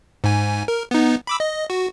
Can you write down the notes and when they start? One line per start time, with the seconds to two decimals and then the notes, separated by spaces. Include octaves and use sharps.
0.24 G#2 G#5
0.68 A#4
0.91 B3 D#4
1.27 B5 D6 E6
1.40 D#5
1.70 F#4